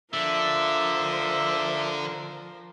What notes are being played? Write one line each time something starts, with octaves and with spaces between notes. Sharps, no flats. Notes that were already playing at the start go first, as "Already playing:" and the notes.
D3 F3 D4 A#4 C5 E5